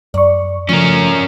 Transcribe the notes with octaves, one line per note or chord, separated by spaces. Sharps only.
F#2 D5 C#6
C#3 F3 A3 C#4 F4 A#4